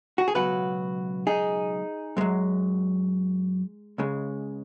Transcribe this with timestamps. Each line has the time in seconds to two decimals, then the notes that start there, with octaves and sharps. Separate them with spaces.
0.18 F#4
0.28 G#4
0.35 C#2 B2 F#3 F#4 B4
1.27 D#4 G#4
2.17 F#2 F#3 G#3
3.98 C#2 C#3 G#3